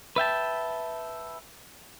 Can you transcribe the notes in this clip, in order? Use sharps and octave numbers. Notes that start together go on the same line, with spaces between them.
B4 E5 G5 A5